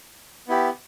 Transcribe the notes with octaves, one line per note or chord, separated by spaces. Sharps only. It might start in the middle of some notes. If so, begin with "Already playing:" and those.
B3 E4 G4